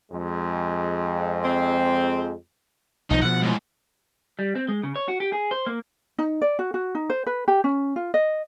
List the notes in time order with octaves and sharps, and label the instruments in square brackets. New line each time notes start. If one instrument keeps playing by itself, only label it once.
[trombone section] F2 G#3
[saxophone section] C4
[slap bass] B1 F3 [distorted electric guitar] D#4
[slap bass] B2 F3 [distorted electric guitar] F#5
[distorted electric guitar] A2 G#3
[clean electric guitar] G3
C4
G#3
C#3
C#5
F#4
G4
G#4
C5
A#3
[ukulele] D#4
D5
F#4
F#4
D#4
C5
B4
G4
C#4
F4
D#5